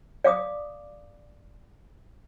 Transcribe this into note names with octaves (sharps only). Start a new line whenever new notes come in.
D5 F5 D6 D#6